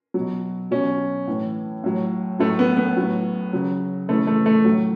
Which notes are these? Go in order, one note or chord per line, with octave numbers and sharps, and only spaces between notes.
B2 F#3
B2 F#3 C#4
A2 E3
A2 F#3
A2 F#3 A3
B3
B3
A2 F#3
C#3 F#3
C#3 E3 A3
A3
A3
A2 F#3